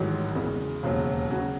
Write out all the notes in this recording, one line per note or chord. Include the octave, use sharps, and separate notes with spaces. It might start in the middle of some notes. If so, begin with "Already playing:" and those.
Already playing: A1 G#2 D#3 F#3
E2 C#3 G#3
E1 D#2 C#3 F#3
C#3 F#3 C#4 F#4